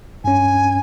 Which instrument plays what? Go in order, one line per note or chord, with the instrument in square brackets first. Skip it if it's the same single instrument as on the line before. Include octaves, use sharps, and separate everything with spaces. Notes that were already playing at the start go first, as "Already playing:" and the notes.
[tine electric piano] G2 C#4 [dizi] G#5